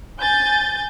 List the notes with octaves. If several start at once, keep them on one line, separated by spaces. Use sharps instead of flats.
G#5 G6 A6